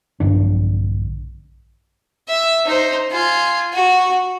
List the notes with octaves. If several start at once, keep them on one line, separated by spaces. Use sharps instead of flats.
A#1 G2 D3 D4
E5
D#4 C5
F4 G#5
F#4